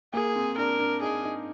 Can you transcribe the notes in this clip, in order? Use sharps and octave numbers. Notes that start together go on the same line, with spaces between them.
A#3 G#4
C4
D4 A#4
D4
D#4 G#4
D#4